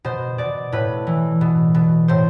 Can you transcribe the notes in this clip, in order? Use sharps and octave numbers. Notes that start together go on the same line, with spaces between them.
B2 C5
B2 D5
A2 B4
E3
B2
B2
A2 C5